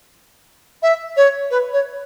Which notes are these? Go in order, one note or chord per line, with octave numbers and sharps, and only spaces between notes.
E5
C#5
B4
C#5